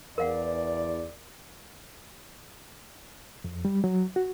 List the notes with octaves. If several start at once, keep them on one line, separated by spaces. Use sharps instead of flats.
E2 A#4 D5 F5 F#5
F2
G3
F#3
F#4